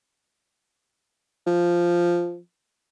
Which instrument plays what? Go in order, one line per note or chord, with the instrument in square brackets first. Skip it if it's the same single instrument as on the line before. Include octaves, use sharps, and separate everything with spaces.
[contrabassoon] F3